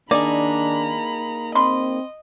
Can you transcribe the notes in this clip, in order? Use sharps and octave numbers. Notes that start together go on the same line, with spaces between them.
D#3 A#3 D4 D#4 G#4 D5 A#5 B5
C4 D#5 B5 C6